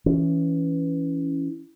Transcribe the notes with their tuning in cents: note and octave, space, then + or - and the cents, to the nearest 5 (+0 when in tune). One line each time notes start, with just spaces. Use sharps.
E3 +5 C#4 +10